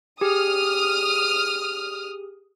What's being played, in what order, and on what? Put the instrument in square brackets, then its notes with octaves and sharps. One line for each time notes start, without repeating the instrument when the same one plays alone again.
[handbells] G4 G#4 [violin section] D#6 F6